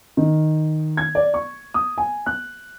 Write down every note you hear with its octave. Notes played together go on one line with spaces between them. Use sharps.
D#3
G#6
D5
C#6
D#6
G#5
F#6